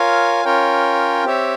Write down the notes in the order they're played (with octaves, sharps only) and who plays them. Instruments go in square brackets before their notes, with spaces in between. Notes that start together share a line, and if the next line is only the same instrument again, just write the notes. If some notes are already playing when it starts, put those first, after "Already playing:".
Already playing: [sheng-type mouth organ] F4 A#4 C#5 F5 G#5
C#4 F4 A#4 C#5 G5
C4 G4 C#5 E5